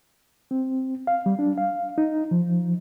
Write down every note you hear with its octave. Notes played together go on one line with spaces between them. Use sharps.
C4
F5
G3
D4
F5
D#4
F3